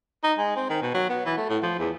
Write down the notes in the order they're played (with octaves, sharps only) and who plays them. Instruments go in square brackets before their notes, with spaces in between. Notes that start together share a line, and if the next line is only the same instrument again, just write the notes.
[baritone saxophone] D#4
G#3
C4
D#3
B2
F#3
B3
E3
A3
A2
F3
E2